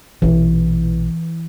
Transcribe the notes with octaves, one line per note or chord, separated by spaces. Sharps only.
A#1 B2 E3